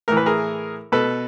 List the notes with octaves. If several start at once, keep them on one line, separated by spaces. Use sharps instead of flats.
A2 E3 A#4
B4
G#4 A#4
B2 A4 B4